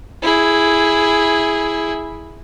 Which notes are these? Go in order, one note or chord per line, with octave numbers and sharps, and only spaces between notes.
E4 G#4